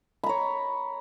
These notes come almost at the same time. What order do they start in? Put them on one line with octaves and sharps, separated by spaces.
B5 A#5 C#5